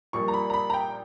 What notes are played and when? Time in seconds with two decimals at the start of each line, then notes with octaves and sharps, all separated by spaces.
0.13 A#1 A#2 G3 A#3 C#6
0.28 A#5
0.34 B5
0.50 A#5
0.54 B5
0.70 A#5
0.74 G5